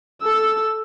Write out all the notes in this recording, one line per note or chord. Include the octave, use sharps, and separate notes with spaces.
A4 E6